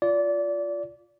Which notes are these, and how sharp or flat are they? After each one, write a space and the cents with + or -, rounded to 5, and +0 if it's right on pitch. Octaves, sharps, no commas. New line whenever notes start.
F4 +0 D5 -25